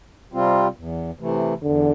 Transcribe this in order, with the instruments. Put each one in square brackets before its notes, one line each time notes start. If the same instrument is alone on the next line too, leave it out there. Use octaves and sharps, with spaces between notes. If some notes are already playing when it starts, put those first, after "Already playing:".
[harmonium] C3 G3 C4 F4
E2
C3 E3 A3
[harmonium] E2 [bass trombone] D3